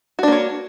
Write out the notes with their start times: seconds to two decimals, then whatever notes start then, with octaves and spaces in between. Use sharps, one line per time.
0.19 F#4
0.23 D4
0.28 A#3
0.32 C#5